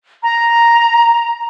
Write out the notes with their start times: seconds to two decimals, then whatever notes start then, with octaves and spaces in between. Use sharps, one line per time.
0.22 A#5